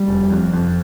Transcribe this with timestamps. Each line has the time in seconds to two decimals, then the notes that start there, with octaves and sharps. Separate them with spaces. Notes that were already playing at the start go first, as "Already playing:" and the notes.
Already playing: G3
0.08 F1
0.30 F2
0.53 F2